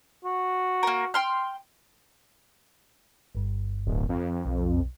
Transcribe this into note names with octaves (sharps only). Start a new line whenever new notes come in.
F#4
A#3 A#4
G5 C6 F6
G1 G2
D1
F2
B1